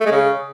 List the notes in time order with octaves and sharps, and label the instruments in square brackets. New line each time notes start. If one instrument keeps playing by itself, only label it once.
[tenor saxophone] A3
G#3
C#3